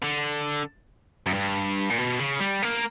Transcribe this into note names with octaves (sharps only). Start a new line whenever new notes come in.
D3
F#2
G2
A#2
B2
C#3
G3
A#3